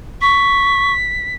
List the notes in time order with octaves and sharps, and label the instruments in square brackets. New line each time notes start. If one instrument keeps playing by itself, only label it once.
[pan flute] C#6 [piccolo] B6